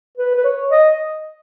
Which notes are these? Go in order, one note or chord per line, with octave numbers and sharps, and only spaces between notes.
B4
B4
C#5
D#5